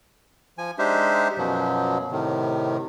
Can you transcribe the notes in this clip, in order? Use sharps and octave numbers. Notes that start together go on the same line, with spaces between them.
F3 G#5
G#3 D4 D#4 G4 C5 E5
F#2 B2 F3 F#3
A2 C3 D#3